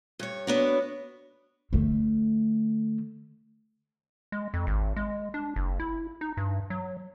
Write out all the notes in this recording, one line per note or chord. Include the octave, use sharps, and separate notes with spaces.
G2 C#5
B3 D4 F#4 C#5
D3 A3
G#3
F2
G#1
G#3
D4
F#1
E4
D#4
G2
F#3